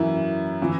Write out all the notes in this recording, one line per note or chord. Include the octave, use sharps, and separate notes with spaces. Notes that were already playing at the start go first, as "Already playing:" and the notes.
Already playing: F#2 E3 E4
E3